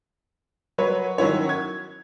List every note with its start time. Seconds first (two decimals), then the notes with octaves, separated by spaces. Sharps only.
0.78 F#3 B4 C#5
1.18 D#3 F#3 C#4 E4 C#5
1.49 G#6